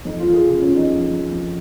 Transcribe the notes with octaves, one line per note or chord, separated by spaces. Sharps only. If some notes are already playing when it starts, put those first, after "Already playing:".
F2 D#4
F4
F2
G#4
C#3 F4
C#4
F2
D#4
F2
F2
F2